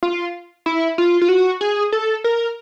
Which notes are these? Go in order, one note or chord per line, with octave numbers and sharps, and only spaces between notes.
F4
E4
F4
F4
F#4
G#4
A4
A#4